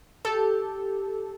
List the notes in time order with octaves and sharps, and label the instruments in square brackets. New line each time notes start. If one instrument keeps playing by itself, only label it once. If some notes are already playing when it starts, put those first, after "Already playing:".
[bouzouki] G4 [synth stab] A4